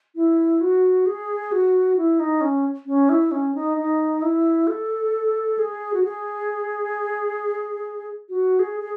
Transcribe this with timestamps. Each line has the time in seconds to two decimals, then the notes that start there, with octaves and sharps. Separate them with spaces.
0.15 E4
0.61 F#4
1.06 G#4
1.52 F#4
1.97 E4
2.20 D#4
2.41 C#4
2.86 C#4
3.09 E4
3.31 C#4
3.55 D#4
3.77 D#4
4.22 E4
4.67 A4
5.58 G#4
5.93 F#4
6.04 G#4
8.29 F#4
8.59 G#4
8.80 G#4